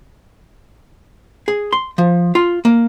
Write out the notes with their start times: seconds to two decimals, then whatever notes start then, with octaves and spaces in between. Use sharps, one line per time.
1.48 G#4
1.72 C6
1.98 F3
2.35 F4
2.65 A#3